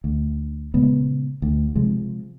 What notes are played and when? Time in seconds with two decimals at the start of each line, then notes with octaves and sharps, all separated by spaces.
0.04 D2
0.74 A#2 C#3 G#3 B3
1.42 D2
1.75 C3 F3 G#3